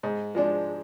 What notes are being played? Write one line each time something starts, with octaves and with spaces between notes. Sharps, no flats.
G#2
F3 G#3 D4